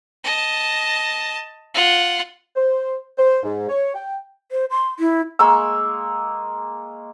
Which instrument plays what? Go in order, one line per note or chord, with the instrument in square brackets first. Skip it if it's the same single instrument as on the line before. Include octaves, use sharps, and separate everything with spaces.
[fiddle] D#5 A5
F4 F#5
[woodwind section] C5
C5
G#2
C#5
G5
[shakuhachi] C5
C6
E4
[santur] G#3 A#3 C#6 E6